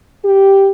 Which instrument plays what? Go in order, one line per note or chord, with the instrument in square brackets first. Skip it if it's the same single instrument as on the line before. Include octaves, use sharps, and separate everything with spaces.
[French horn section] G4